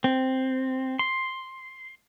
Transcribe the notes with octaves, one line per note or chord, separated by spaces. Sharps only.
C4
C6